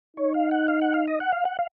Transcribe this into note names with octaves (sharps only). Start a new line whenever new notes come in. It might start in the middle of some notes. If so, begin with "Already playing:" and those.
D#4 C#5
F5
F#5
F5
F#5
F5
D#5
F#5
F5
F#5
F5